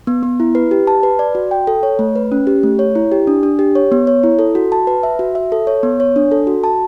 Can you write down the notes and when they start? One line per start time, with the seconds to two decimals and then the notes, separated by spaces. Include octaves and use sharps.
0.07 B3
0.23 B3
0.40 E4
0.55 B4
0.71 G4
0.87 A5
1.03 B4
1.19 D5
1.35 F#4
1.51 G5
1.67 A4
1.83 C#5
1.99 A3
2.16 B4
2.32 C#4
2.47 G4
2.63 A3
2.79 C#5
2.95 E4
3.12 G4
3.27 D4
3.43 D4
3.59 G4
3.75 C#5
3.92 B3
4.07 C#5
4.23 E4
4.39 A4
4.55 F#4
4.72 A5
4.87 B4
5.03 E5
5.19 F#4
5.35 E5
5.52 A4
5.67 C#5
5.83 B3
6.00 C#5
6.16 D4
6.32 A4
6.47 F#4
6.64 A5